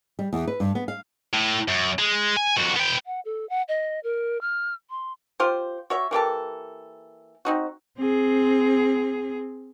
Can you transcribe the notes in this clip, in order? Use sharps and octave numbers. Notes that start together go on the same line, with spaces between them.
G3
E2
B4
G2
B3
F5
A2
F#2
G#3
G#5
F2 F#4
B3 G5
F#5
A4
F#5
D#5
A#4
F6
C6
F4 G4 C5
F#4 C#5 E5
E3 A#3 G4 A4
C4 D#4 F#4
C4 G#4